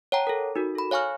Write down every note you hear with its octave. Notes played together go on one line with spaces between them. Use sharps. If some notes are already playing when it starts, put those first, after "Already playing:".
C#5 F#5 G5 A5 A#5
A4 A#4
D#4 F#4 A#4
A4 B5
C#5 F5 G#5 C#6 F6